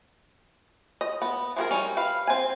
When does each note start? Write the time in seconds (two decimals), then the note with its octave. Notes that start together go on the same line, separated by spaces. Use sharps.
1.01 D#5
1.22 B3
1.56 F3 E4 F#4 G#4 A#4
1.71 G3 C#4 D#4
1.97 B4 F5
2.27 C4 G#5